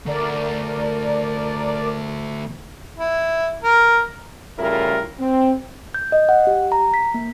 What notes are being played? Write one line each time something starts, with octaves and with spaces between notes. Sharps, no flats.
D2 A#4 D5
E4
A#4
A2 C#3 G3 E4 F4 A#4
C4
G6
D#5
F#5
G4
A#5
B6
A#3